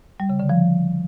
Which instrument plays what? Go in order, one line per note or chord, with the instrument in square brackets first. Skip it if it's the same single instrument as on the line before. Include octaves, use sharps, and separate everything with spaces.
[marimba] G3
C#3
D3
F3